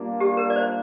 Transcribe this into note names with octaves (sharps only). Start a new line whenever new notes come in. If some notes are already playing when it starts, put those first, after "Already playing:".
Already playing: G3 A#3 D4 F4
G4
A#4
D5
C5